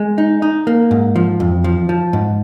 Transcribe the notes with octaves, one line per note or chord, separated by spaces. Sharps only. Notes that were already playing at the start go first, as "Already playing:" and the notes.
Already playing: G#3
D#4
D#4
A#3
G#2
F3
F2
F3
F3
G#2